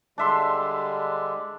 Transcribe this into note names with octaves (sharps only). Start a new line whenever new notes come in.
D3 G3 G#3 D4 E5 C6